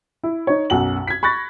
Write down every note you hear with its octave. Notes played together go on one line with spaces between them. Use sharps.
E4
D#4 C#5
B1 F#2 F#5 F#7
G#6 B6
B5 C#6 F#6 A6 A#6